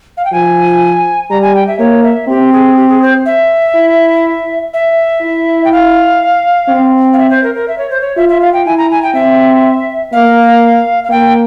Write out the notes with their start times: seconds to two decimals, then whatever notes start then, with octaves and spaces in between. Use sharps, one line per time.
0.17 F5
0.25 G5
0.32 F3 G#5
1.30 G3 A#5
1.42 G#5
1.55 G5
1.67 E5
1.79 A#3 C#5
2.03 E5
2.28 C4 G4
2.53 G#4
2.77 G4
2.89 G#4
3.02 C5
3.26 E5
3.75 E4
4.74 E5
5.22 E4
5.65 G5
5.72 F5
6.69 C4
7.13 F5
7.18 E5
7.30 C5
7.43 A#4
7.55 A#4
7.68 E5
7.78 C#5
7.90 C5
8.01 C#5
8.16 F4 E5
8.29 E5
8.41 F5
8.53 G5
8.66 E4 G#5
8.78 A#5
8.91 G#5
9.03 G5
9.14 C4 E5
10.13 A#3 F5
11.04 F5
11.10 A#3 G5